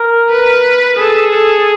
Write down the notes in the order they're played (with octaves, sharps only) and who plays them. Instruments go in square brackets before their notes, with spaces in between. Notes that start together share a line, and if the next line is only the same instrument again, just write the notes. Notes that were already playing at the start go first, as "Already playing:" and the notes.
Already playing: [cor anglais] A#4
[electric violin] B4
[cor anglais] G#4 [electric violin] A4
[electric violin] A4